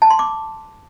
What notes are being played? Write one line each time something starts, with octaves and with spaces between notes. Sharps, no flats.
A5
C6
D6